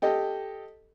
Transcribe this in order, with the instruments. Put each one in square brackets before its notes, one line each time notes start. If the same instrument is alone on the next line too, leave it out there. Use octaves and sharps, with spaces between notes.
[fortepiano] G4 A4 D#5